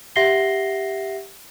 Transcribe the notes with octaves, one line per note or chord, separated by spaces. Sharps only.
G4 E5 F#5 A#6 C7 G7